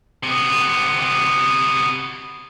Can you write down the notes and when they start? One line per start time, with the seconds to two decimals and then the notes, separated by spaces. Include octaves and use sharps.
0.23 C3 B3